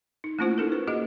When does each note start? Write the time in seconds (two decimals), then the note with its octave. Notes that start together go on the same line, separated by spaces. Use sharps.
0.24 D#4
0.39 A3 A#3 C#4 E4 F4 C5
0.58 D#4 A4 A#4
0.72 B4
0.87 A#3 F#4 G#4 D#5